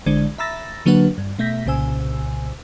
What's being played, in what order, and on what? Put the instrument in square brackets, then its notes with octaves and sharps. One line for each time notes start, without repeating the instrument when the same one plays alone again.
[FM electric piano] A1 D3 G#3 C5 D5 G#6
E5 A#5 B5 E6 A6 A#6
D3 F#3 A#3 D4 B4 F#5
G2
B2 A3 E5 G6 A#6 B6
C2 A#2 C#3 C5 G#5 E6